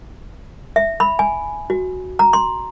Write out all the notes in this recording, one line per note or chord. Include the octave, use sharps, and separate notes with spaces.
E5
B5
G#5
F#4
A#5
C6